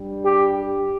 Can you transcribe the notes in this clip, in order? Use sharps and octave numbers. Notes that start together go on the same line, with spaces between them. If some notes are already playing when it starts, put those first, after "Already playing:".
Already playing: G2 G3
G4
G4